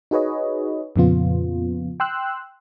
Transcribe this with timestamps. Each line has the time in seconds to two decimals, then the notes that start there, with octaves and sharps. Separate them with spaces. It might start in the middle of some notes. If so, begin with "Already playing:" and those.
0.11 D#4 F#4 G#4 B4 C#5 D#5
0.96 F2 A#2 C#3 F3 B3 F4
2.00 G5 C6 E6 F#6